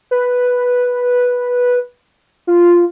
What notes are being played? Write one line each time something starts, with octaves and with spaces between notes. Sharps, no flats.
B4
F4